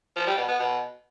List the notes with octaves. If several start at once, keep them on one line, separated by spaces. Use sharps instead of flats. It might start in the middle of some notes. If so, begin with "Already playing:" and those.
F3
G3
B2
B3
B2